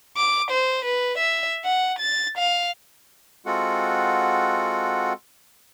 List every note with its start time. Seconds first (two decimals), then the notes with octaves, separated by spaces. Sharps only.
0.17 D6
0.51 C5
0.85 B4
1.18 E5
1.65 F#5
1.99 A6
2.38 F5
3.46 G#3 C4 F4 F#4 A4 F#5